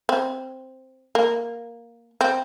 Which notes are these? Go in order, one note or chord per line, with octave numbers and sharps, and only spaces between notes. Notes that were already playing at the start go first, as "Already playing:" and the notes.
C4
A#3
C4